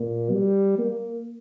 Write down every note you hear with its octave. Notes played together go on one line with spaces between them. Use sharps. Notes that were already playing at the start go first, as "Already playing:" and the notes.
Already playing: A#2
G3
A#3